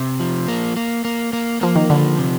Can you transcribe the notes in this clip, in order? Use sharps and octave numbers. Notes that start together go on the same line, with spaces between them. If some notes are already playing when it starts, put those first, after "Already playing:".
Already playing: C3
F3
A#3
A#3
A#3
A#3
F3 A#3
D#3
D3 F3
C3